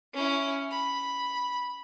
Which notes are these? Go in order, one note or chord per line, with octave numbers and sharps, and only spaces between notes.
C#4 E4
B5